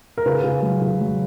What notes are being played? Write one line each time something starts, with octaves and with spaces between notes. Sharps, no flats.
A#4
C#3 B4
C#3
F#3
C#3
F#3